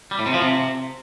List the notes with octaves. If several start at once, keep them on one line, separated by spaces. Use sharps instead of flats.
G3
A2
C3
F3
C3